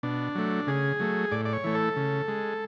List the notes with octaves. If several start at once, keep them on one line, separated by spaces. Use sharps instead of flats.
B2 D4
F#3 A3
C#3 G#4
F#3 A3
A2 D5
D5
C#5
E3 A3
A4
C#3
G#3